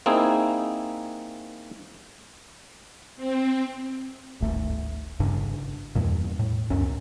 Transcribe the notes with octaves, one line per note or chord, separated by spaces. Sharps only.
A#3 C4 D#4 E4 G#4
C4
D1 G#1 A3
G#1 G2 C#3 D4
E2 G2 A#2
A2
C#2 F#2 C#4